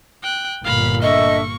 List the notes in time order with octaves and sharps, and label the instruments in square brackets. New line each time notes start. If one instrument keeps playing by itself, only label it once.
[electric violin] G5 F#6
[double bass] G1 A#2 [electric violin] F5 B5
[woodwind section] A3 D4 E5 [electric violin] A#3 C#6 [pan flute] D#5